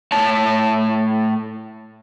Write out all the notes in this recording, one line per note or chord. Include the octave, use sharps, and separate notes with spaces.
A2 C#5 A5